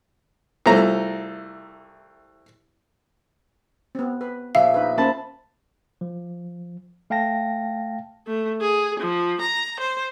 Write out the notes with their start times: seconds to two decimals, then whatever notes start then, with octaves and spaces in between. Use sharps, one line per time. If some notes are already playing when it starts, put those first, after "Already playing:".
0.66 C2 F3 A3 A#5
3.95 B3 C4
4.21 B4
4.55 A#1 E5 F5
4.74 D#4 B4
4.98 A#3 C#4 B4 C5 A5
6.01 F3
7.10 A3 F5 G5 A5 A#6
8.27 A3
8.61 G#4
8.99 F3
9.41 A#5
9.80 C5